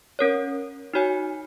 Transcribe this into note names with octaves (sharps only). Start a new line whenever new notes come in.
C#4 A#4 C#5
D#4 F#4 C#5 G#5